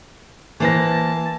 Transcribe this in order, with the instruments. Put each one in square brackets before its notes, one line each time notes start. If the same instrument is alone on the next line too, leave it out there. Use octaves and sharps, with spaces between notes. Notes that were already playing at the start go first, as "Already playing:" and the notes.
[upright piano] E3 A#6 [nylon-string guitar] A#3 B4 C5 [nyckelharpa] A5